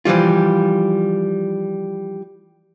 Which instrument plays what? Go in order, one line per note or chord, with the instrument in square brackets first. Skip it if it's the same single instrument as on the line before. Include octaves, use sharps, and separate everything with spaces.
[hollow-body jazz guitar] E3 F3 G3 F4